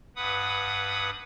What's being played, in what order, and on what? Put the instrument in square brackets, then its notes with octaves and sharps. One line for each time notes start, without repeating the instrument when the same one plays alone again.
[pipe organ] G2 B4 F#5 B5 D#6